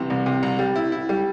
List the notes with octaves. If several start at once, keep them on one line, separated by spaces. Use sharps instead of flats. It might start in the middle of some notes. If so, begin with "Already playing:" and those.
Already playing: C2 C3 E3
C2
C3
C2
G3
E4
E4
G3